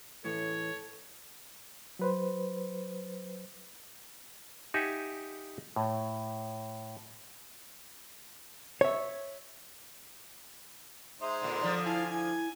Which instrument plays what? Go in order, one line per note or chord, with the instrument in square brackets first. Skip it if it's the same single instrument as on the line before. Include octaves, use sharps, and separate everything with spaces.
[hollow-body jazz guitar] A2 E3 [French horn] A4 [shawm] C#5
[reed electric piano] F#3 B4 C5
[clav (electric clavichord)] D#4 G4 E5 F#5 G#5
A2
[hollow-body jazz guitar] C#5 E5
[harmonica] G#3 D#4 C5 [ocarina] E5
[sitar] A#2 D3
[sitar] D3 F3 [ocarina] D5
[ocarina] E4 [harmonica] F5 G#5 A5
[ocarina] E4 [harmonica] G#5